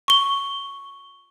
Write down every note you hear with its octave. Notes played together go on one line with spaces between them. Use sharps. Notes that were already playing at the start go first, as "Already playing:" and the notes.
C#6 G7